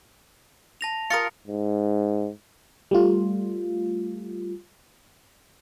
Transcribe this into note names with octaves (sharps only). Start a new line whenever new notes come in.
A5 A#6 F7
F4 A#4 D#6 A#6 C#7
G#2
G3 A3 F4